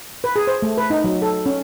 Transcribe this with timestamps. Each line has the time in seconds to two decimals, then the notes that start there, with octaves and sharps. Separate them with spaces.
0.24 B4
0.36 G#4
0.47 C5
0.62 A3
0.77 B4
0.90 D#4
1.04 F#3
1.22 A4
1.46 C#4